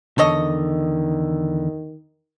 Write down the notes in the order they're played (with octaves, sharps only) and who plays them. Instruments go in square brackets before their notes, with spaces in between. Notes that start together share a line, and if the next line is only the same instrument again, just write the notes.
[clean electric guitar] E2 D3 [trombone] D#3 [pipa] A4 C#5 D#5